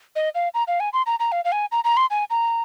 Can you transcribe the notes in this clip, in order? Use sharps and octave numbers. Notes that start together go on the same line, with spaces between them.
D#5
F5
A#5
F5
G#5
C6
A#5
A#5
F5
F5
G#5
A#5
A#5
C6
G#5
A#5